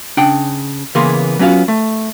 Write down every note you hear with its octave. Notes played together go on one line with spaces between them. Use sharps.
C#3 D4 F#5 G5
C#3 E3 A#3 B3 G#4 C6
F#3 B3 C#4 D4 F4 F#4
A3